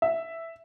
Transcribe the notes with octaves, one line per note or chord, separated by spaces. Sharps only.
E5